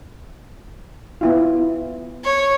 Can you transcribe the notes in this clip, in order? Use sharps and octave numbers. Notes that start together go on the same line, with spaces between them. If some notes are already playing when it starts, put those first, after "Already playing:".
B3 E4 F4
C#5